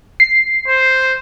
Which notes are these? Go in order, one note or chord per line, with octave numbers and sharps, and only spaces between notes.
C7
C5